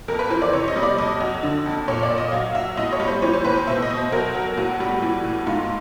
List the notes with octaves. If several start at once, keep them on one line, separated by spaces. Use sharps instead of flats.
F2 A#4
B4
E3 C5
D5
C3 C#5
D#5
G3
D5
F2 D#5
F#3
D3
F2
A#2 C#5
D5
A#2
D#5
F#3 F5
F#3 E5
A2 D#5
C#5
G3
C5
E3 C#5
C5
A2 B4
C5
B2 E5
D#5
B2
C5
F#3 A#4
F#3
A2 F#4
G3
E3
A2
G#2 F4